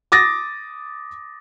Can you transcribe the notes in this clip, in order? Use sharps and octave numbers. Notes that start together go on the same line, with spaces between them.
D6 D#6 A6 A#6